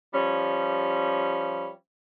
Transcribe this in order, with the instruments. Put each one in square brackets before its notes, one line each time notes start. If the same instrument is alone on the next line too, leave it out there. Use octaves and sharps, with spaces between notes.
[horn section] F3 G3 C#4